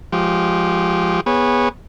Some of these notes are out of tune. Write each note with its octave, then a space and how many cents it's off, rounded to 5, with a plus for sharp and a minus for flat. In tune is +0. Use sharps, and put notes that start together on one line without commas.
F3 +0 G#3 +0 G4 -20
B3 -10 G#4 -25 C#5 -5